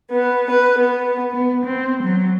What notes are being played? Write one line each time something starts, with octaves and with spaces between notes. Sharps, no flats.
B3
B4
B3
B3
C4
F#3